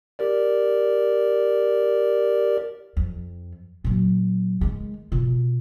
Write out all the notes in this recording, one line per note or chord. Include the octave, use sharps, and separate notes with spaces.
G4 A#4 D5
F2
A#2 F#3
D#3 G#3
B2 F4